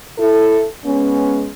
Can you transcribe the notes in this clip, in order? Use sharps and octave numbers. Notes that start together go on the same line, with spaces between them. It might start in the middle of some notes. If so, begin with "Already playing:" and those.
E4 A4
G#3 B3 C#4